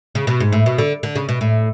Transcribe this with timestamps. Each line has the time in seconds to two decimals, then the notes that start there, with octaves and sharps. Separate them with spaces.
0.15 C#3
0.27 B2
0.40 G#2
0.52 A2
0.66 B2
0.78 D3
1.03 D3
1.15 C#3
1.29 B2
1.41 A2